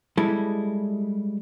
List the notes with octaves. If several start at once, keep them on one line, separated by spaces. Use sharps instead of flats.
G3 G#3 E4 A4